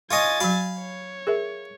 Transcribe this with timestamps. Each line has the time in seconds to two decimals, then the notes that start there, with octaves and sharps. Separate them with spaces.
0.11 F4 C#5 D#5 G#5 A6
0.40 F#3 F#4 F5 B5
0.80 C#5
1.27 G#4 A#4 E5